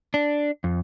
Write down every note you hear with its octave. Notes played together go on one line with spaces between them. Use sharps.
D4
F2